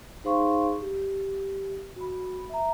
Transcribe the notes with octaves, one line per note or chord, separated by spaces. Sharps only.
D#4 G#4 C5 F5 C6 C#6
G4
F#4 B5
E5 A#5